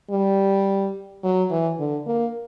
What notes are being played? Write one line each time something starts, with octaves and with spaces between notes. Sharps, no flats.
G3
F#3
E3
D3
A#3